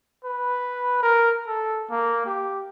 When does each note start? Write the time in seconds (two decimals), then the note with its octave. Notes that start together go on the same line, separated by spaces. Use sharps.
0.24 B4
1.03 A#4
1.47 A4
1.91 A#3
2.25 G4